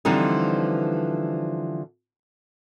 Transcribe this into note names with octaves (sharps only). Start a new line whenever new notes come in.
D3 E3 F3 G3 C4 D#4